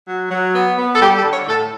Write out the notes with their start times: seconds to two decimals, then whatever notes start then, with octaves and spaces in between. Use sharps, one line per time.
0.08 F#3
0.31 F#3
0.55 B3
0.78 B3
0.93 A4
1.01 G3 G4
1.16 A4
1.24 D3
1.32 C#5
1.47 A2 A4